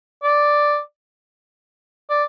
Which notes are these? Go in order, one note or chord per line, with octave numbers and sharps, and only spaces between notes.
D5
D5